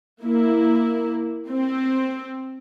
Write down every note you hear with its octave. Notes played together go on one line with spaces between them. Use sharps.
A#3 E4
C4